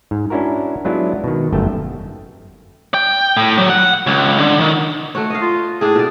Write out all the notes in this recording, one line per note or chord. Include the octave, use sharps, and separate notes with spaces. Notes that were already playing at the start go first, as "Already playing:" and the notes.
G#2
C#4 D4 E4 F#4 A#4
F#3 G#3 B3 D4 E4 F4
B2 D#3
G1 F#2 A3 G5 A5
G5
A2
F#3
F#5
C#2
D3
D#3
A3 F#4 C#5
D#5 F5
F4
A2 D4 G#4
B2 D5